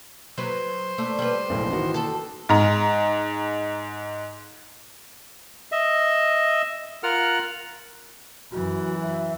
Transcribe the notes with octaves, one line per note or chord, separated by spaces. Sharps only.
F#3 B4 C5
A3 D4 B4
G3 G4 B4
F#1 B1 A2
D#3 E3 B3 F#4 G5
F#4 A4
G#2 A#5
D#5 E5
F4 A#4 F#5 F6
F#2 E3 F#4
E5